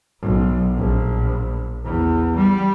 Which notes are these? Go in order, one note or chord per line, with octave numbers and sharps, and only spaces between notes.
B1
A#1
E2
G3